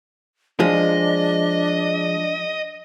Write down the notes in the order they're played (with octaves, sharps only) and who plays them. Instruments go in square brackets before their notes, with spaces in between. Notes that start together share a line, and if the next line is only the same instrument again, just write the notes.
[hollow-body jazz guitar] F3 G#3 [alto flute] D4 [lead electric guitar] D#5